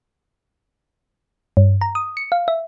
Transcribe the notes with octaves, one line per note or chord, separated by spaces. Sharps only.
G2
A#5
D#6
C#7
F5
E5